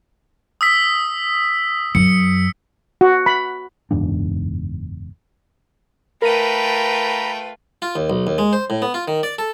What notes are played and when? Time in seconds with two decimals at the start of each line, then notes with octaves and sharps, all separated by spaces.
0.61 D#6 E6 B6
1.95 F#2 C#7
3.01 F#4
3.26 B5
3.91 F#1 E2 G#2 D4
6.22 A3 F4 A#4 B4 G5 A#5 B5 D#7
7.82 F4
7.96 D#2
8.10 B1
8.27 D#2
8.38 G#3
8.53 C5
8.70 A2
8.82 B3
8.94 F4
9.08 D#3
9.23 D5
9.38 A4